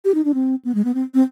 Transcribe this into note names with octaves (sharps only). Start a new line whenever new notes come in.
G4
D#4
D4
C4
B3
G#3
B3
C4
C4